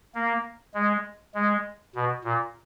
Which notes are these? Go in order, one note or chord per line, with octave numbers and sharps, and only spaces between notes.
A#3
G#3
G#3
B2
A#2